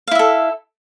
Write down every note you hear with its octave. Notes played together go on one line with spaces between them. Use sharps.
E4 A4 E5 F5